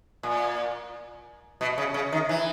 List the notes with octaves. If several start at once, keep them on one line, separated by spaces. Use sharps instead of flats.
A#2
B2
C#3
C#3
D#3
E3